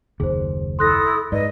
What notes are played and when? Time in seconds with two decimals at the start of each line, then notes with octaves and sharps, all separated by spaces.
0.20 F#1 D#2 G#4 C5
0.79 E4 A4 C6 D#6 F#6 A#6
1.32 G#2 B4 D5 D#5